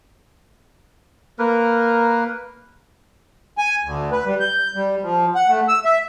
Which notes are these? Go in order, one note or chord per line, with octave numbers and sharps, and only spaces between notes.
A#3 A#4 B4
G#5
D2
B4
G3
G6
G3
F3
F#5
A3
E6
E5